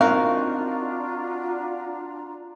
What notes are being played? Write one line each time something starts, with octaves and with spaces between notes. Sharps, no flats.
C4 D4 D#4 F4 F#4 A#4 F5 A#5